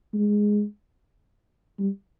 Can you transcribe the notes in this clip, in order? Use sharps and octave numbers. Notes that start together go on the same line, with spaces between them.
G#3
G3